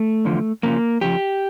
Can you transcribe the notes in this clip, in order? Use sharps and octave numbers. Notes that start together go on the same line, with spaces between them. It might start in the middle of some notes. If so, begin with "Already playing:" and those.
Already playing: A3
E2 D3 F3
F2 C#3 F3 A#3
F2 C#3 F3 G4